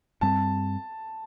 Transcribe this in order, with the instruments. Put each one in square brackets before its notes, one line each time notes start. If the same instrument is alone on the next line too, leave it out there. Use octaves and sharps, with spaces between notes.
[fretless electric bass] G2 G3 C4 [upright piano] A5